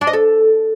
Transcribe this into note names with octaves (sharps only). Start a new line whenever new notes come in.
D4
D#5
A4